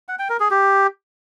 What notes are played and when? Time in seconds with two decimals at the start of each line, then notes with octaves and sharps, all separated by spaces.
0.08 F#5
0.19 G5
0.29 A#4
0.40 G#4
0.51 G4